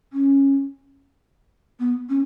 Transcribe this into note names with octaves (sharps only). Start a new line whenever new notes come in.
C#4
B3
C#4